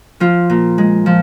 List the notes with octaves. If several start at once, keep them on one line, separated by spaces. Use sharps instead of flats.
F3 F4
A#2
G#3
F3